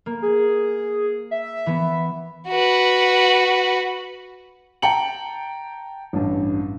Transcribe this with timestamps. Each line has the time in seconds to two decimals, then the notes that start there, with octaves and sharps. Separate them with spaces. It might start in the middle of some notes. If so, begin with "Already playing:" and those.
0.06 A#3
0.22 G#4
1.31 E5
1.66 E3 B3
2.48 F#4 B4
4.82 G5 A5 A#5 C#7 F#7
6.13 A1 G2